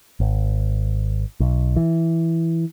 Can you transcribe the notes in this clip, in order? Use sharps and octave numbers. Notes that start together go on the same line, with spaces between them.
G#1
B1
E3